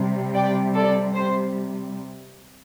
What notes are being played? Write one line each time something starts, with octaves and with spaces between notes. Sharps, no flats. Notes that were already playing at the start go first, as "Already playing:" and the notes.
Already playing: C3 G3
D5 G5
A4 D5
C5